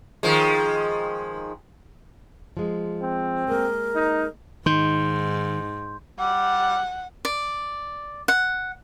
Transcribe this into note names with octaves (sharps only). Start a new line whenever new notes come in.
D#3 F3 G#3
F3 G#3
C4
G#3 A#3 A#4
D#4
G#2 D#3 C6 G6
G3 F#5
D5
F#5